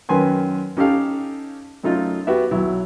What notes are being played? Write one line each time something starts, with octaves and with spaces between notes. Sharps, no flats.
F#2 D#3 B4 G#5 C6
C#4 D#4 G4 A4 F5
F#2 A3 D#4 F4
B3 F#4 G4 E5
B1 F#3 E4 F#4